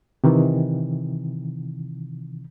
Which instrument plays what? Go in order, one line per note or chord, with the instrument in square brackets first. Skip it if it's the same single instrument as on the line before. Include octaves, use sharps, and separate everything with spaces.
[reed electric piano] C3 D#3 E3